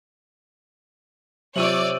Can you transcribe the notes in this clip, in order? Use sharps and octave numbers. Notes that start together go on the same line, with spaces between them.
C3 F#3 F4 C#5 D5 E6 D#7 F#7